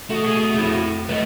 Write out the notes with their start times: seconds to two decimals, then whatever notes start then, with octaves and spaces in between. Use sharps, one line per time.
0.10 A3 F#4 D#5
0.26 G#4
0.54 F2 A3 E4
1.09 A3 B4 D5 D#5